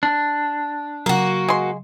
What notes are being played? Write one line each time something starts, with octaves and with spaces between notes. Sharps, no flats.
D4
C#3 F#3 A#3 F#4
G#3 C6